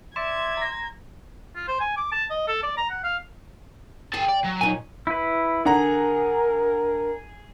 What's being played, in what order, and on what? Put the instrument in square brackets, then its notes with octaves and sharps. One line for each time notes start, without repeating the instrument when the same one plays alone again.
[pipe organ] D5 E5 D6 [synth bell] C6 E7 [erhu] G#6
[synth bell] A#5 A#6
[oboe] F4
C5
G#5
D6
A5
D#5
A4
D5
A#5
F#5
F5
[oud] G4 [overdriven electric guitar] G#4 A5
[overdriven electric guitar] D5
F#3
[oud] A#2 C#4 [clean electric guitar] D#4 G#5
[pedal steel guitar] E4 B4
[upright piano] D3 F#5 A#5 [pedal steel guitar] G#4 [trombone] A#4